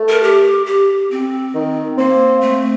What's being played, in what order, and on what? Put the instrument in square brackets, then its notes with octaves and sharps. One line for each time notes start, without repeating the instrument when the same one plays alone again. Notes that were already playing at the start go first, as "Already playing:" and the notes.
Already playing: [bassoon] A3
[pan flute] A#4
G4
G4
C4
[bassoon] D#3
[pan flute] A#3 [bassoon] C4
[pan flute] A3